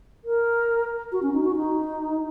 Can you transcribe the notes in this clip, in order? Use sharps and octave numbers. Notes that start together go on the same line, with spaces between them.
A#4
F#4
C#4
D#4
F#4
D#4